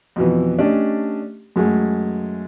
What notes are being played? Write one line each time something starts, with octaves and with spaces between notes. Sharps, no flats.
F2 B2 E3
A3 C#4 D4 G4 D5 D#5
F#2 G#3 A3